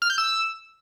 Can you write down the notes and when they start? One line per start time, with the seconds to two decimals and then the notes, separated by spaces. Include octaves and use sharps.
0.02 F6
0.10 G6
0.18 E6